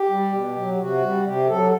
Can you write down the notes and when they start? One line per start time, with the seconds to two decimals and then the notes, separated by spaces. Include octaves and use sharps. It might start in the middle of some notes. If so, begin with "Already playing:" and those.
Already playing: G4
0.09 G3
0.33 B2
0.56 F#3
0.79 C3 F#4
1.02 G3
1.25 C3 G4
1.48 F#3 A4